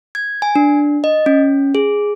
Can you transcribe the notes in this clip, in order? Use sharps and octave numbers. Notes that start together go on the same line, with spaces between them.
G#6
G#5
D4
D#5
C#4
G#4